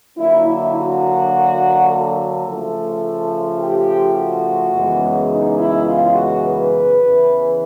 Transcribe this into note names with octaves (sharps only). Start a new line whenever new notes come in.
D3 F#3 A#3 D4 E4
E4
F#4
A4
C#3 F3 A3
G4
F#4
F#2 C#3 E3 G#3 B3
D#4
E4
F4
F#4
B4
E2 C#3 E3